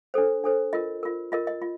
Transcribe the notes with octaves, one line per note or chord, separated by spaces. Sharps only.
D4 A4 C5
D4 A4 C5
F4 A#4 D#5
F4 A#4
F4 A#4 D#5
D#5
F4